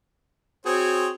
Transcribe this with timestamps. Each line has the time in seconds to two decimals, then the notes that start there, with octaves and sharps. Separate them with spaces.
0.66 C4 F#4 G#4 C#5